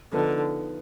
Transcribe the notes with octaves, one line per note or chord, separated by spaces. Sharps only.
D3 F3 B3 D#4